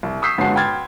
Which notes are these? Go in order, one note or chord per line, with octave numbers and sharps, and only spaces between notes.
C2
C#6 D#6 E6 G6 B6 C7
G1 G#2 C#4 F#4 A5 C7
G5 B5 C6 F6 G#6 A6